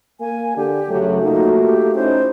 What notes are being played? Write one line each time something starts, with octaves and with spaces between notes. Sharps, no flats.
A#3 G#5
D3 G4
F#2 C#3 F#3 A3
A#3 D#4 F4 F#4
G4
C#4 D#4 E4 C5